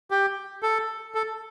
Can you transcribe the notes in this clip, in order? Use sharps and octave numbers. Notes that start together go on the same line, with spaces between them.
G4
A4
A4